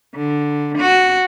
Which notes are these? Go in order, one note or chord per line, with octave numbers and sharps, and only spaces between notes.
D3
F#4